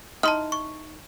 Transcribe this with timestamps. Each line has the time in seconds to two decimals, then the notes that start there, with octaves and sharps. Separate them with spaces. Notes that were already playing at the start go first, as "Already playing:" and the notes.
0.23 D#4 E4 A5 C6 F6
0.52 C#6